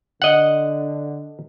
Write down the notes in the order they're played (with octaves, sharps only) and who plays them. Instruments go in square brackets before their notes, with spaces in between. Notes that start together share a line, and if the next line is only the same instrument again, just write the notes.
[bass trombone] D3 [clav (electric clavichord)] D#5 F#5